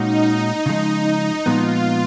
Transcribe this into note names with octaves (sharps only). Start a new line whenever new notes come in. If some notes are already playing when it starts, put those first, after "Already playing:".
Already playing: A#2 G#3 C#4 D#4 F#4
C#3 F3 G#3
A#2 F3 G#3 B3 F4